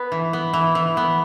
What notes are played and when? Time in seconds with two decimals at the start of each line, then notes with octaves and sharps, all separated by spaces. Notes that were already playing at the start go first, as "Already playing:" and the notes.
Already playing: B3 B4
0.12 E3
0.33 B3
0.53 E3
0.75 E3
0.97 B3